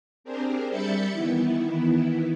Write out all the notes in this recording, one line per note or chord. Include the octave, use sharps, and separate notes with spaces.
C4 D4 G4 G#4 A#4 C5
G3 E5 B5 G6 A6 C#7
D#3 E3 B3 E4